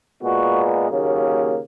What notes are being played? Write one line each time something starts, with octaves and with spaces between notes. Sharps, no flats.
A#2 G#3 B3 F#4
D#2 C#3 F#3 A#3